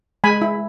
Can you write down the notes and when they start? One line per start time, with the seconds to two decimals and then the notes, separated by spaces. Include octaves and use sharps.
0.24 G#3 G#5 B5
0.42 E4